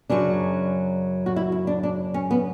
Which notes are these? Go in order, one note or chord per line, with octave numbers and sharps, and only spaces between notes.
F#2 C#3 F#3 D4
F#4
E4
E4
D4
D4
C#4
B3